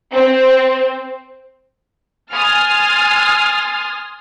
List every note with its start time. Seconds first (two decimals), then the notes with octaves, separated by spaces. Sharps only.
0.13 C4 C5
2.32 G#5 C6 D#6 F6 A6